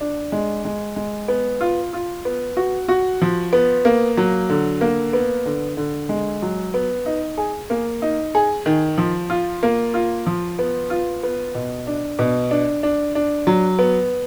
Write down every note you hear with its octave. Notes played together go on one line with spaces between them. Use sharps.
D4
G#3
G#3
G#3
B3
F4
F4
B3
F#4
F#4
F3
B3
A#3
F#3
D3
A#3
B3
D3
D3
G#3
F#3
B3
D#4
G#4
A#3
D#4
G#4
D#3
F3
F4
A#3
F4
F3
B3
F4
B3
B2
D4
B2
D4
D4
D4
F#3
B3